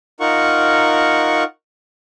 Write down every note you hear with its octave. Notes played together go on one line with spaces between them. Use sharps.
D#4 F4 A#4 F#5 C#6